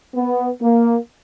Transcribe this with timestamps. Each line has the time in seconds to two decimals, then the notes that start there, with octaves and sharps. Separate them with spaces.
0.14 B3
0.62 A#3